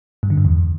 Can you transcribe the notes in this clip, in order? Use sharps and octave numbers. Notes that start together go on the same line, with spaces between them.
G2
D3
G2
E2